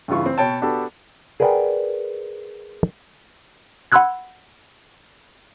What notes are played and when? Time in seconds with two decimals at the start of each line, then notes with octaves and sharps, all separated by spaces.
0.08 G2 C#3 E3 F4 C#6
0.26 C4
0.38 B2 C#5 G5 A5
0.62 B3 D4 F#4 G4 A4
1.40 G#4 A#4 B4 D5 F#5 G5
3.92 F#5 B5 C6 E6 F#6 G#6